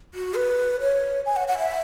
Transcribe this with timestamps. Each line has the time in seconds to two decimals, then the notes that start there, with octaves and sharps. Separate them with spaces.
0.14 F#4
0.36 B4
0.81 C#5
1.26 G#5
1.36 F#5
1.48 F#5
1.59 E5